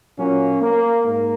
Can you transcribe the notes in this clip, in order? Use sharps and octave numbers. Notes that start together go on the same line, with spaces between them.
A#2 F#3 A#3 C#4
A#3
G#2 A#3